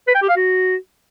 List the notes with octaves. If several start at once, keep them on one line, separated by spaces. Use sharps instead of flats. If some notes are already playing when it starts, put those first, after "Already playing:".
B4
G5
G4
F5
F#4